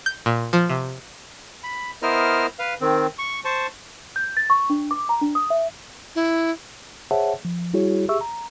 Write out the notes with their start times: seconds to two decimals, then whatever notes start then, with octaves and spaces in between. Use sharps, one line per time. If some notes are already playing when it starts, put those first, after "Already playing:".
0.06 G6
0.26 A#2
0.53 F3
0.70 C3
1.64 B5
2.02 B3 E4 A#4 C5 D#5 F6
2.59 B4 F5
2.81 D#3 C4
3.19 C#6
3.45 C5 A5 C#6
4.16 G6
4.37 A6
4.50 C#6
4.70 D4
4.91 D6
5.09 A#5
5.21 D4
5.35 D#6
5.50 E5
6.15 E4
7.11 G#4 C5 C#5 E5 F#5 A5
7.45 F3
7.73 G3 E4 F#4 G#4 C#5
8.09 G4 G#4 E5 C#6 E6
8.21 A#5